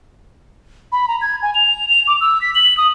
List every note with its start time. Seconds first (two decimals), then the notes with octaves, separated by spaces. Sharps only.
0.92 B5
1.08 A#5
1.21 G#6
1.42 G#5
1.54 F7
1.89 F7
2.08 D6
2.21 E6
2.41 B6
2.55 F#7
2.77 D#6